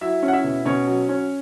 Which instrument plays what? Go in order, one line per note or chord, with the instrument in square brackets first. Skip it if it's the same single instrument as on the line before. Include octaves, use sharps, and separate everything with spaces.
[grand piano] F#3 E4 E5
C#4
F#5
E4 E5
B2
B2 C#4 C#5
F#3
C#4